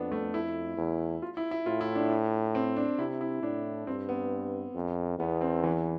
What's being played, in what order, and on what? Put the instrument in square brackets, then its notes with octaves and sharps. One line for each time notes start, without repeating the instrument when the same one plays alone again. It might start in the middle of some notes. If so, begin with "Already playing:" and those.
Already playing: [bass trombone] F2 [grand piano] B3 D4
[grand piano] A3
[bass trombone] F2 [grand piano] E4
[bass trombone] E2
[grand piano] F4
E4
E4
[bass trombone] A2 [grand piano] F4
[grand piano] E4
D4
C4
D4
[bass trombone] C3 [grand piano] E4
[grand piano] E4
[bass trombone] A2 [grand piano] D4
[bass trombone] G2 [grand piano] C4
[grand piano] B3
[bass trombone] F2
[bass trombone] E2 [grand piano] B3
[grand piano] C4
E3